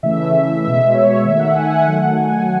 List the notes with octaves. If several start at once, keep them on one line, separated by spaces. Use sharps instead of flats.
C#3 E3 A3 E5
E5
B2 G#3 E5
C#5
D#3 A3 E5
F#5
G#5
F#5
D#3 F#3 A3 F#5
G#5